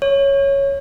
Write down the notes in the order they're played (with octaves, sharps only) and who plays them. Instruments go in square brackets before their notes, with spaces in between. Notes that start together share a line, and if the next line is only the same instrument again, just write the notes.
[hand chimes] C#5